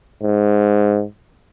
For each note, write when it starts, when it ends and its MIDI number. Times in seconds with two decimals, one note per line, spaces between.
0.23 1.04 44